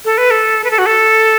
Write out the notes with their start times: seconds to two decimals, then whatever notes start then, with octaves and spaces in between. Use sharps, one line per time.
0.05 A4
0.18 B4
0.31 A4
0.64 B4
0.71 A4
0.78 F#4
0.86 A4